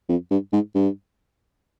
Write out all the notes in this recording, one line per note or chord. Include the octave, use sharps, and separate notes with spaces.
F2
G2
G#2
G2